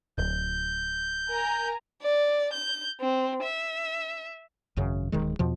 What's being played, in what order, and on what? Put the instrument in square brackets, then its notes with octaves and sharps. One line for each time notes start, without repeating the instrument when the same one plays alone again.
[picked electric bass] D1 [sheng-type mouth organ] G6
[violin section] A#4 G#5 A#5
[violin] D5
G6
C4
E5
[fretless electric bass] G#1 F#2 C#3
D1 D#3 G#3
E2 B2 F3